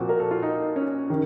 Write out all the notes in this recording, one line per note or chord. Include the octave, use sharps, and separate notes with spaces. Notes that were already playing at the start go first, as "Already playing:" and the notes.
Already playing: A#2 F3 C4 F#4
A#4
A4
F4
D#4
C#4
D#3